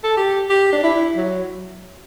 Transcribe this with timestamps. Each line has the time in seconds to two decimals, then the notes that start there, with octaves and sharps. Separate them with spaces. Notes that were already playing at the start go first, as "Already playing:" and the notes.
0.04 A4
0.17 G4
0.50 G4
0.72 D4
0.83 E4
1.16 F#3